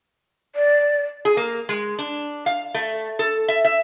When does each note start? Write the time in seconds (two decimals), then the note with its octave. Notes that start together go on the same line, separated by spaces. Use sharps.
0.56 D5
1.25 G#4
1.37 A#3
1.69 G#3
1.99 D4
2.46 F5
2.74 A3
3.19 A4
3.48 E5
3.65 E5